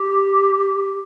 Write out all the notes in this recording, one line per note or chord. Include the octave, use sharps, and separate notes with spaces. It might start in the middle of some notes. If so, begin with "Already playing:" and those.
Already playing: G4